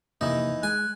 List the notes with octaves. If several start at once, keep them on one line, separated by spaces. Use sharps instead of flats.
F2 C3 E3 A#3 D#4
G#3 G#5 F#6